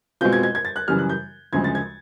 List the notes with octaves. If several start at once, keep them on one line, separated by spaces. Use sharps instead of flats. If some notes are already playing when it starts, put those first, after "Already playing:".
B2 G#3 C4 F4 G6
G#6
G#6
G#6
A6
F#6
F#2 C#3 E3 G3 F6
F#6
G6
D2 C#3 F3 G#3 G#6
A6
G#6